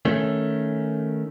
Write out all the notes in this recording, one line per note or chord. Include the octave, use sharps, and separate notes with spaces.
D#3 A3 C#4